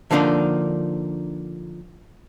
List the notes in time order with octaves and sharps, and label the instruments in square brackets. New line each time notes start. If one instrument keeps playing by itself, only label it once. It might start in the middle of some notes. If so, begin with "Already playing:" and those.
[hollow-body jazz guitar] D3 F3 A#3 D4 D#4